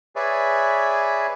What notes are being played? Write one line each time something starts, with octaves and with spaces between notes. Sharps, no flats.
G#4 B4 C#5 D5 E5